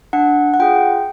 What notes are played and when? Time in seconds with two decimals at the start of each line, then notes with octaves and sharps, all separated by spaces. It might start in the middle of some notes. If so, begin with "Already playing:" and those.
0.13 D4 F#5
0.54 F#5
0.59 F4 G#4 G5